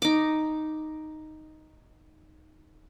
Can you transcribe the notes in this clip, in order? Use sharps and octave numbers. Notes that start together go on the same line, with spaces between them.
D#4 D6